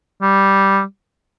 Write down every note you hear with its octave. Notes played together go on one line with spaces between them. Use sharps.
G3